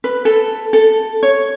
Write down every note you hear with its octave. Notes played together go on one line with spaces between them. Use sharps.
B4
A4
A4
C#5